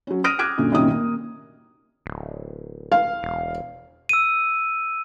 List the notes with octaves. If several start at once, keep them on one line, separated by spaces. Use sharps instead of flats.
F#3 C#4
D#6 F6 A#6 D7 D#7
D6 F6 F#6 G#6 D7
F#2 A#2 D3
C2 F#2 A#2 D#3 C#4 D#6
A#3
D1
F5
E1
E6 D#7